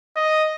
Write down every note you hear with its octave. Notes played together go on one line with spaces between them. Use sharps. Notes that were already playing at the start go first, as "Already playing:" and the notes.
D#5